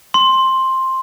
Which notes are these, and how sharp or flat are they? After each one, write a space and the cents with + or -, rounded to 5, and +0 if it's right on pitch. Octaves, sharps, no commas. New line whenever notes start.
C6 +10